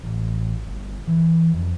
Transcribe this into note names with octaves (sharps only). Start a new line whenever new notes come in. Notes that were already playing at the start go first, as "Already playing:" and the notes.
A1
G1
E3
F2